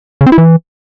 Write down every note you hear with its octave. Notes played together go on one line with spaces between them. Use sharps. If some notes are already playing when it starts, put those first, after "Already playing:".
C#3
C4
E4
E3